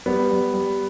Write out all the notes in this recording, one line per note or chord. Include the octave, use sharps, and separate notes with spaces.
G3 B3
G3
G3